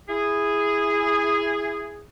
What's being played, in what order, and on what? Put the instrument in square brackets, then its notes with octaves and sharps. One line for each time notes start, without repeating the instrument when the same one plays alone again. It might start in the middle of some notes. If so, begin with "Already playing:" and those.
[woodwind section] E4 G#4